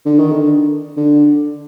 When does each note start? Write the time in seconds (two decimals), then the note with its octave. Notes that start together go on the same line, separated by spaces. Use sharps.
0.06 D3
0.19 D#3
0.32 D3
0.97 D3